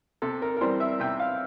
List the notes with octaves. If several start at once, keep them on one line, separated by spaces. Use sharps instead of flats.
C3 A4
A#4
A#4
E3 G3 C4 C5
E5
C3 G5
F5